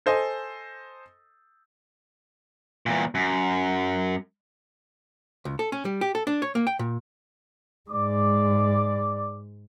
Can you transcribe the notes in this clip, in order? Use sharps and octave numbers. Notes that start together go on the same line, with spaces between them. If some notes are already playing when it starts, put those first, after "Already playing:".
A4 C5 D#5 G#5
E2 A#2
F#2
C#2
A4
C#4
G3
G4
A4
D4
C#5
A#3
G5
A#2
G#2 G#3 D5 D6